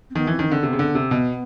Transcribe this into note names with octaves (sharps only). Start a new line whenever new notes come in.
C4
D#3 B3
E3 C4
D#3 C#4
D3 C4
C3 B3
C#3
D3
C3
B2 B3